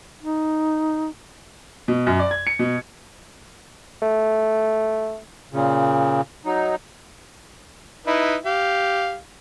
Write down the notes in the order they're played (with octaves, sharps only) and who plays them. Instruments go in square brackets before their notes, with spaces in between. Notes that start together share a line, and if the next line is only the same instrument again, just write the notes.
[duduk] D#4
[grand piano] B2
F#2
D5
G#6
C#7
B2
[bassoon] A3
[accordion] A#2 C#3
F#3 D#4
[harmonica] D#4 E4 B4
G4 F5